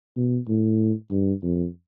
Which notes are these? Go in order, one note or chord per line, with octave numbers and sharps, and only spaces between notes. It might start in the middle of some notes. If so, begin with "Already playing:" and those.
B2
A2
G2
F2